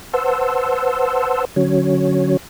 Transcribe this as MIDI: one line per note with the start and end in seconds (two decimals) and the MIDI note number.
0.13 1.45 71
0.13 1.45 72
0.13 1.45 78
0.13 1.45 81
0.13 1.45 84
0.13 1.45 88
1.56 2.37 50
1.56 2.37 54
1.56 2.37 61
1.56 2.37 66
1.56 2.37 73